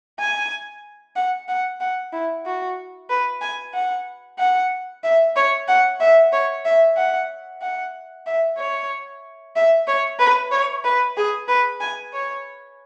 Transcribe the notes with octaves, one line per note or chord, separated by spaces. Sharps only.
G#5
F#5
F#5
F#5
E4
F#4
B4
G#5
F#5
F#5
E5
C#5
F#5
E5
C#5
E5
F#5
F#5
E5
C#5
E5
C#5
B4
C#5
B4
G#4
B4
G#5
C#5